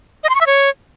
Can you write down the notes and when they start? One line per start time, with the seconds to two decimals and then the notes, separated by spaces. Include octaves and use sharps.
0.24 D#5
0.29 C6
0.35 C#6
0.41 E5
0.47 C#5